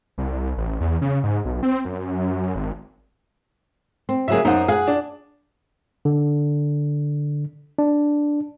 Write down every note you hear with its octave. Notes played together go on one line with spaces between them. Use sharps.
C2
A1
E2
C#3
G#2
B1
C4
F#2
G#1
C4
C#3 F#3 A#3 G#4 E5
F#2 D#4 C5 F#5
G#4 F5 F#5
D4
D3
D4